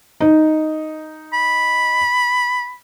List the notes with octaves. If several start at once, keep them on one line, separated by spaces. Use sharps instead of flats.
D#4
B5